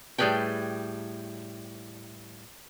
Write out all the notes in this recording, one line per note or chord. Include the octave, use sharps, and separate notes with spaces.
A2 G3 G#4 B4 G5